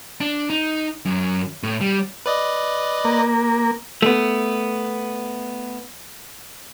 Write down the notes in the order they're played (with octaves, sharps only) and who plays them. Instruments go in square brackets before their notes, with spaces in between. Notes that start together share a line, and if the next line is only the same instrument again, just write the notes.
[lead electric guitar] D4
D#4
F#2
A2
G3
[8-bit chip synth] B4 D5 D#5
[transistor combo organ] A#3
[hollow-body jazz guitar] A3 B3